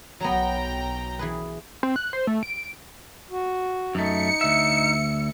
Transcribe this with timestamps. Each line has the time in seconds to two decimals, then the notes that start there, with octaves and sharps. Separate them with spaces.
0.20 B1 F#3 B3 G5 A#5
1.19 E3 G#4 B4
1.83 C4
1.96 F#6
2.13 C5
2.27 A3
2.43 D7
3.30 F#4
3.95 F#2 A3 D#4 C#7
4.41 D2 E5